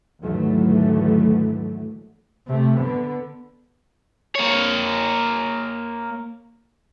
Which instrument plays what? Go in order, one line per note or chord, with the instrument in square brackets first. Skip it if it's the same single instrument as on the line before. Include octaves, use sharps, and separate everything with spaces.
[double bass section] D#2 G#2 D3 E3 F#3 A3
[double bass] C3 A3
D3 B3
[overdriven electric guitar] A#3 C#5